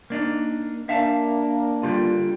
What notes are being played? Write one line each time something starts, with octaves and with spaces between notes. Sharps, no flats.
A#3 D4 D#4
A#3 D4 E5 F5 A5
D3 G3 F4